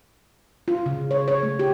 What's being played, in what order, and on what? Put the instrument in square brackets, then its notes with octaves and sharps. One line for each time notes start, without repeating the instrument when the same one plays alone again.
[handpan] F4
C#3
C#5
C#5
A3
G4